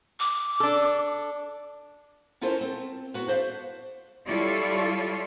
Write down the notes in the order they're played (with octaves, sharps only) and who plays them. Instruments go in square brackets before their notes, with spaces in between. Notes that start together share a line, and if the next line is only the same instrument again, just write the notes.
[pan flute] D6
[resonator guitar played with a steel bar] D4 A4
[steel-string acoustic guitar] C#4 E4 F4 A4 A#4 C5
C4
B3 F#4 B4
D4 C5 E5 F5
[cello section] G3 E4 F4 A4 C#5 D5